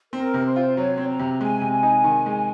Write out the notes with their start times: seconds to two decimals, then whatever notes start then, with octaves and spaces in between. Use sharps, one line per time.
0.13 C4 A#4
0.34 C3
0.44 C5
0.56 F4
0.76 F#3 C#5
0.97 C4
1.08 A#5
1.19 C3
1.41 G#3 G#5
1.61 C3
1.72 G#5
1.83 D#4
2.04 D#3
2.26 G#3